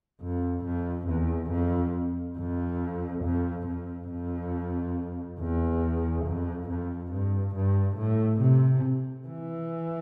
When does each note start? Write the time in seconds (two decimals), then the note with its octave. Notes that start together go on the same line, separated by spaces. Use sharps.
0.23 F2
0.66 F2
1.09 E2
1.52 F2
2.38 F2
3.25 F2
3.68 F2
4.11 F2
5.40 E2
6.26 F2
6.70 F2
7.12 G2
7.55 G2
7.98 A2
8.41 C3
9.28 E3